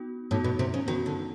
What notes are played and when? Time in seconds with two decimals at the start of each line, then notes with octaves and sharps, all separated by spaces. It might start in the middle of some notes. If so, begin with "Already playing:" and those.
Already playing: B3 D#4 F#4
0.31 A2 B3 D#4 F#4
0.44 B2
0.59 C3
0.74 C#3
0.87 D#3 B3 D#4 F#4
1.06 D3